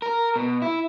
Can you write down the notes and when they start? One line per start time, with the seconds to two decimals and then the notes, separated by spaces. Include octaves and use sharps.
0.02 A#4
0.36 B2
0.62 E4